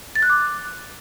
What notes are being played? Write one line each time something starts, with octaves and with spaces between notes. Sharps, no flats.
A6
F#6
D6